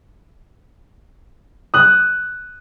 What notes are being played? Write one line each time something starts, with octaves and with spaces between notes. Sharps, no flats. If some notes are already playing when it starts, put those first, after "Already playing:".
D#6 F#6